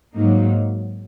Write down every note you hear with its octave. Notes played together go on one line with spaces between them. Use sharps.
G#2 F#3 A#3 D#4